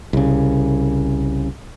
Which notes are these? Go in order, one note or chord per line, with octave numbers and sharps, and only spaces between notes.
C2 C#3